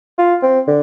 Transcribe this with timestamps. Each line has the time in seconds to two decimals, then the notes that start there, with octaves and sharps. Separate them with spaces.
0.18 F4
0.42 C4
0.67 D3